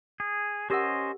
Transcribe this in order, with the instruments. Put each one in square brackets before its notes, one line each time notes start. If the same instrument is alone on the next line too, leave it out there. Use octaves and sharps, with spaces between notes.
[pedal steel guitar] G#4
[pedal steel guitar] C#4 C5 D#5 [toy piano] G4 A#4 F#5